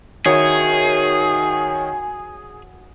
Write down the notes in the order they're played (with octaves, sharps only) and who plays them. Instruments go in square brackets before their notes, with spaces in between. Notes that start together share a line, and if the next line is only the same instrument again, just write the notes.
[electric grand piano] D#3 C#5 [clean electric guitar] F#4 A#4 E5 [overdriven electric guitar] G#4